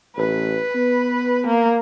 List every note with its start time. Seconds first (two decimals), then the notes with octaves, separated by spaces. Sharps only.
0.17 A1 B4
0.75 B3
1.47 A#3